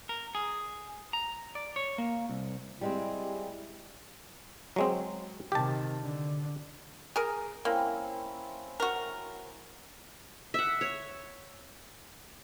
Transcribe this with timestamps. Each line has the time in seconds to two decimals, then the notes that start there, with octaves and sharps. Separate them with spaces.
0.09 A#4
0.35 G#4
1.13 A#5
1.55 D5
1.76 C#5
1.98 A#3
2.29 C2
2.81 G3 G#3 C4 E4 G4
4.76 F#3 G#3 C4
5.52 C3 D#3 G4 A5
6.02 D3
7.16 G#4 A#4 A#5
7.65 A#3 C4 C#4 E4
8.80 F#4 A#4
10.54 E5 F#5
10.81 C#5